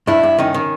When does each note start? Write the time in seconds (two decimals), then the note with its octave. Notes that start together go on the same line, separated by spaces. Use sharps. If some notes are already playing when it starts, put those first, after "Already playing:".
0.07 G2 D4 E4
0.23 G2
0.38 D#3 C#4 D#4
0.54 D#3